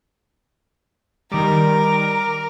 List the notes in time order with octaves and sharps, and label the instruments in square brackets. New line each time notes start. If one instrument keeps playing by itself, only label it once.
[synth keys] D#3 G3 [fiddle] A#4 [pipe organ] D6